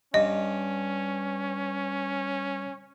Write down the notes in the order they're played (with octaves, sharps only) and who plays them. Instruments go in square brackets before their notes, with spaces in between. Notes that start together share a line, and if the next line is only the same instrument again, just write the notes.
[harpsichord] G2 [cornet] C#4 [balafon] D#5